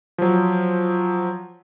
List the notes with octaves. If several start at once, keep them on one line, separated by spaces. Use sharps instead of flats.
F3 F#3